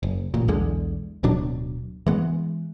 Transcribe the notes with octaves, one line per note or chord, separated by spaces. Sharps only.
F#1
A1 A#2
B1 E2 D3 G#3
D1 B2 F#3 D4
E3 G#3 B3